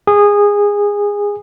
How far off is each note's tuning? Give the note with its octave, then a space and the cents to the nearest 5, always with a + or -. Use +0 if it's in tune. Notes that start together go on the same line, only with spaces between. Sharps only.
G#4 -20